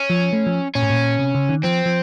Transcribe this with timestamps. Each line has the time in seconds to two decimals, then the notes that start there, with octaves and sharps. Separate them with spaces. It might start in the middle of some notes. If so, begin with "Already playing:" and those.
Already playing: C#4
0.10 F3
0.33 A3
0.46 F3
0.75 A#2 C#4
0.82 A2
0.90 A#2
1.19 C3
1.35 C#3
1.49 D#3
1.63 F3 C4
1.86 F3